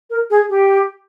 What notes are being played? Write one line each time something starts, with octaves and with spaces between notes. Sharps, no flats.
A#4
G#4
G4